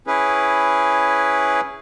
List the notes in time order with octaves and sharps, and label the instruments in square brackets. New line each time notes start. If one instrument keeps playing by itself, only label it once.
[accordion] C#4 E4 G#4 B4